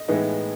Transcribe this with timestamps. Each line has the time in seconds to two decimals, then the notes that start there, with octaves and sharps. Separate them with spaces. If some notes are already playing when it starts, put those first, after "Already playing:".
Already playing: D#5
0.08 A2 E3 G#3 B3 D#4